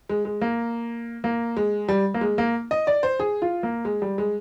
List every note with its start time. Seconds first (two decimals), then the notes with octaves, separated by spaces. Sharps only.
0.09 G#3
0.25 G#3
0.41 A#3
1.24 A#3
1.57 G#3
1.89 G3
2.14 A#3
2.21 G#3
2.38 A#3
2.71 D#5
2.87 D5
3.03 C5
3.20 G#4
3.42 F4
3.63 A#3
3.85 G#3
4.02 G3
4.18 G#3